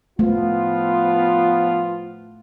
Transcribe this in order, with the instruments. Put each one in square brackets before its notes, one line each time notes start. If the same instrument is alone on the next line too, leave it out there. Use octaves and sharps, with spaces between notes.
[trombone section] F3 B3 F4 [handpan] A3